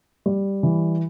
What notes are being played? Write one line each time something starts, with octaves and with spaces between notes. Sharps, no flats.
G3
E3